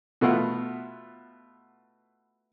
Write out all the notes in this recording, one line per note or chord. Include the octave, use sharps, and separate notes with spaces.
B2 A3 B3 E4 F4 F#5